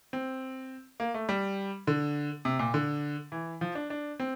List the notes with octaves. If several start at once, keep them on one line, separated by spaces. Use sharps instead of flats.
C4
A#3
A3
G3
D3
C3
A#2
D3
E3
F3
D4
D4
C4